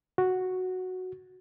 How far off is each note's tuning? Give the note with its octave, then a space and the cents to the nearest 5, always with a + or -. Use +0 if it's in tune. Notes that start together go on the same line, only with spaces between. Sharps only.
F#4 -5